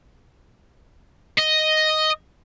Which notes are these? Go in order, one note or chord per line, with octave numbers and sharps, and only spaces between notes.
D#5